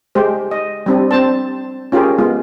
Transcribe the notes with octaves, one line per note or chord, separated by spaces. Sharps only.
G#3 G4 C5
D#5
G3 C4 D4
C4 C5 A5
C#4 F4 G4 G#4 A#4
G#3 B3 F4